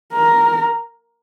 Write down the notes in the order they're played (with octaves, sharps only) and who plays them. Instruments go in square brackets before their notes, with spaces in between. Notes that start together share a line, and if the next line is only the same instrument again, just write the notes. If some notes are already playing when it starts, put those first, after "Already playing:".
[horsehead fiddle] A#4